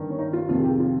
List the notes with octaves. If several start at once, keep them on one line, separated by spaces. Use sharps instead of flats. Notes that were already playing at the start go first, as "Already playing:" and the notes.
Already playing: G2 D#3
C#4
D#4
F4
F2 C3 D#3 F4
G#4
G4
F4